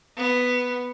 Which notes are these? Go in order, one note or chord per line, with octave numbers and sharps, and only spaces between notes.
B3